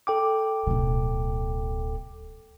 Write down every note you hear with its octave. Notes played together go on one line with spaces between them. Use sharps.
A4 G5 D6
D1 B2